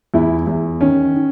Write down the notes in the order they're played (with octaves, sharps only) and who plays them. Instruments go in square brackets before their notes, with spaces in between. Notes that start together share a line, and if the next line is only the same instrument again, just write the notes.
[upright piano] E2 E4
E2
D#3 C#4
D#3